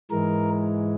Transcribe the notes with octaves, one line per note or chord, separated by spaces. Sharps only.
G#2 E3 G#3 A#4